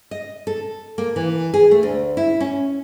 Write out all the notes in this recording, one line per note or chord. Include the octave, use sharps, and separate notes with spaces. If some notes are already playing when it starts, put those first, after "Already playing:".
D#5
A4
A#3
E3
G#4
A3
D2
E4
C#4